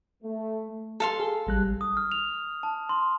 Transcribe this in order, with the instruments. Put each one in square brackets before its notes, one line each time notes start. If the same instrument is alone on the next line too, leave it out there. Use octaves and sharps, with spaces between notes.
[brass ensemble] A3
[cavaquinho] A4 F5 C6
[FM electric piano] G#4
A1 G3 F#6
[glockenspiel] D#6
F6
F7
A5
C6